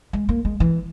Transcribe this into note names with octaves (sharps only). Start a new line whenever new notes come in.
G#3
A#3
G#3
E3